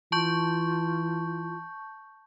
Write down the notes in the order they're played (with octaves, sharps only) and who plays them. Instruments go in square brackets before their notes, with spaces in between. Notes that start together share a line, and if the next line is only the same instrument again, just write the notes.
[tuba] E3 [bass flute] F4 [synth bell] A5 C#6 G6